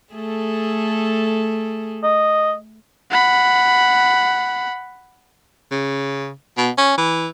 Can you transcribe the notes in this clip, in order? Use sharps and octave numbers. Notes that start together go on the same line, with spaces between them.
A3 G#4 A4
D#5
F#5 B5
C#3
B2
C#4
E3